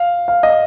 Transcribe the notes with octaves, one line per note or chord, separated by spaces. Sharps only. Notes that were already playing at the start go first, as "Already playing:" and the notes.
Already playing: F5
F5
D#5